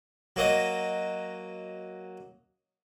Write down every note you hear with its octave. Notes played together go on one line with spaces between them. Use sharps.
F#3 A#3 D#5